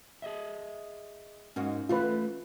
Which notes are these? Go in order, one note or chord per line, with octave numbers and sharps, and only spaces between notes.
G#4 D#5 E5
G#2 A#3 C#4 F#4
E3 A3 F4 B4